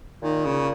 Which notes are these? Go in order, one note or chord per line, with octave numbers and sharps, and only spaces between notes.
A#2 D#3
C#3